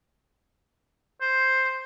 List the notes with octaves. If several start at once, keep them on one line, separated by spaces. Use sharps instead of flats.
C5